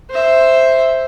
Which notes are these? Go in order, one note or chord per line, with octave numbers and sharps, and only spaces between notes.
C5 E5